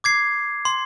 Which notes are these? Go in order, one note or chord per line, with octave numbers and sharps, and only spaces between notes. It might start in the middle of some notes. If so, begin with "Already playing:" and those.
D6 G#6 C7
C6